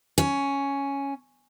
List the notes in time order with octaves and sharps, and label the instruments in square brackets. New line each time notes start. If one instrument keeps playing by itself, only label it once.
[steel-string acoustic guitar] C#4